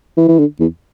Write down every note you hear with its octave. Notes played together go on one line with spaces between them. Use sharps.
E3
E3
D3
E2